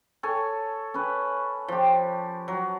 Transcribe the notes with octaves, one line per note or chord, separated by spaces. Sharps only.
A4 C#5 G#5
C#4 B4
F3 G4
F#3